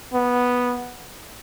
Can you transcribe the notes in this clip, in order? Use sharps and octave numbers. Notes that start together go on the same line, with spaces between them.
B3